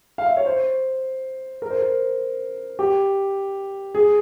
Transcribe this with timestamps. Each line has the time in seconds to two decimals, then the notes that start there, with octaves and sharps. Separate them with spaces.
0.18 F5
0.26 E5
0.37 C#5
0.46 C5
1.62 A#4
1.70 C5
1.78 A#4
2.79 G4
3.95 G#4